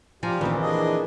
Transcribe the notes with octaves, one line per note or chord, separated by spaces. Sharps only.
F3 F4 G4 D5 G#5 A#5 A#6
A#1 D#3 E3 C4 E4
D4 G#4 D#5